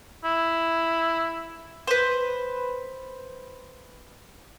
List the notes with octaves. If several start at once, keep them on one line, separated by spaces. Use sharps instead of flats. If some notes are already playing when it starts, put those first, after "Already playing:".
E4
B4 C5